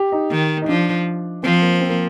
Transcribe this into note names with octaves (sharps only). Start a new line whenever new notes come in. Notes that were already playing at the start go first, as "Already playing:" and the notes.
Already playing: G4
D#4
D#3
D#4
F3 D4
F3 C4
A#3
C4
A#3